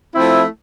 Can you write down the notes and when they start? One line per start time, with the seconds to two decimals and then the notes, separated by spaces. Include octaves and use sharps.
0.15 F3 A3 C4 E4